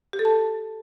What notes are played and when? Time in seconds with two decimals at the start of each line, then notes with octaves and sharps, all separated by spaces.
0.13 G4
0.19 A4
0.25 A5